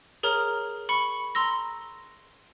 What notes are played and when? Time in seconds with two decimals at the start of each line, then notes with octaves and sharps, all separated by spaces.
0.23 G#4 A#4 C#5 A#5 F6
0.89 B5 C#6 C#7
1.35 A#5 C6 E6 A#6